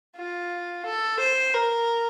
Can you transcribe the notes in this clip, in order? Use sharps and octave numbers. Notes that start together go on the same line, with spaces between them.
F4
A4
C5
A#4